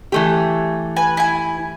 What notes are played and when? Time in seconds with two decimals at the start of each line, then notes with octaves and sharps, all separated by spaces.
0.12 E3 A3 G4
0.96 B4 G#5
1.17 E4 G#5